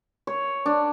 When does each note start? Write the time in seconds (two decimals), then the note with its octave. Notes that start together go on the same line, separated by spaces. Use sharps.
0.27 C#5
0.66 D4